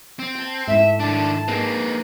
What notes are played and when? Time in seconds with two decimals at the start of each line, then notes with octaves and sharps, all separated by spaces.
0.19 C4
0.35 G5 A5
0.68 G#2 A3 E4 E5
1.00 D#3 D4 A5
1.48 A#3 C4 D#4 G#4 B4